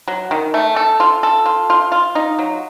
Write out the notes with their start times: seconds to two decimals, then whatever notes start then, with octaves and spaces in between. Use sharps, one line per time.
0.08 F#3
0.31 D#3
0.54 A3
0.76 A4
1.00 F4
1.23 A4
1.46 F4
1.70 F4
1.92 F4
2.15 D#4
2.39 F#3